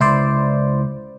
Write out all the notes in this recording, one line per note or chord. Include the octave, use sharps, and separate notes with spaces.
C#2 E4 C5 D5